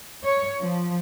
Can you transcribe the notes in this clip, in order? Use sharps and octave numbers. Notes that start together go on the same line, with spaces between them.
C#5
F3